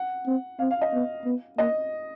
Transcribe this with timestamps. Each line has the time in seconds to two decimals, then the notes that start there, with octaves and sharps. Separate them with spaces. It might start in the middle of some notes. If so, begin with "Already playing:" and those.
Already playing: F#5
0.26 C4
0.59 C4 F5
0.71 F5
0.81 D#5
0.93 B3
1.25 B3
1.58 A#3 D#5